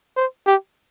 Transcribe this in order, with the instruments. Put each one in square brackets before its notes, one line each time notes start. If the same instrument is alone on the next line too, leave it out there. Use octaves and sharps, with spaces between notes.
[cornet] C5
G4